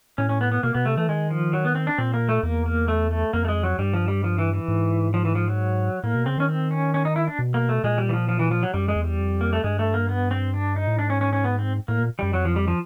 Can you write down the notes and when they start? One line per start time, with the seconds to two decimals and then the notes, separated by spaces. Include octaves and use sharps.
0.18 A2 C#4
0.29 C#4
0.41 B3
0.52 B3
0.63 B2 A#3
0.74 B2 B3
0.86 C3 A3
0.97 E3 A3
1.08 D#3 G#3
1.31 F3
1.53 F#3
1.65 B3
1.75 C4
1.87 D4
1.98 A#2 C4
2.14 A#3
2.29 A3
2.43 E2 A#3
2.66 A#3
2.88 A3
3.11 A3
3.33 F2 A#3
3.45 A3
3.48 G#3
3.63 F#3
3.79 G2 G3
3.94 F3
4.08 G3
4.24 F3
4.39 E3
4.53 E3
4.68 G#2
5.14 F3
5.25 E3
5.35 F3
5.48 F#3
6.03 A2 A#3
6.15 B2
6.26 C#3 C4
6.37 D#3 C#4
6.49 C4
6.71 C#4
6.94 C#4
7.05 D#4
7.16 E4
7.27 D4
7.39 B2
7.54 A#3
7.69 A3
7.84 A#2 G#3
7.98 G3
8.09 E3
8.13 F3
8.29 F3
8.39 E3
8.51 F3
8.63 F#3
8.74 F#2 G3
8.88 G#3
8.96 E2
9.04 G3
9.19 F2
9.41 A#3
9.53 A3
9.64 G2 G#3
9.79 A3
9.94 A#3
10.09 B3
10.31 C4
10.54 D4
10.76 D#4
10.87 A2
10.99 G#2 D4
11.10 C#4
11.21 C#4
11.33 C#4
11.44 B3
11.59 C4
11.88 A2 A#3
12.00 A#2
12.19 F#2 G3
12.33 F2 F#3
12.45 F3
12.56 G3
12.68 F3